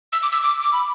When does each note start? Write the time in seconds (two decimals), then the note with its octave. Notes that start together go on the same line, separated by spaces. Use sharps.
0.13 E6
0.22 D6
0.32 E6
0.43 D6
0.62 D6
0.73 B5